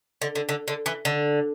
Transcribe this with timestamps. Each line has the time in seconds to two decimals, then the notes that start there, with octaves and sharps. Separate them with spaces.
0.22 D3
0.35 D3
0.49 D3
0.68 D3
0.86 E3
1.05 D3